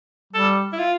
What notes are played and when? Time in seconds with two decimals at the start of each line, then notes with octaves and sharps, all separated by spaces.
0.33 G3 A4
0.73 E4
0.79 F4